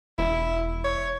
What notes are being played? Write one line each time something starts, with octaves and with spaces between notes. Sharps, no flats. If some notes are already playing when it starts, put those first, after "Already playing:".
E1 E4
C#5